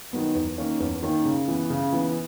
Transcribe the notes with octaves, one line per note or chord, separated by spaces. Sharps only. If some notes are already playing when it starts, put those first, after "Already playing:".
D#3 F#3 B3
E2
D#3 A#3 C#4
E2
D#3 A#3 C#4
C#3
E3 B3
C#3
E3 B3